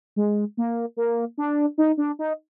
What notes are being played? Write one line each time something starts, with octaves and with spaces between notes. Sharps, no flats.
G#3
A#3
A#3
D4
D#4
D4
D#4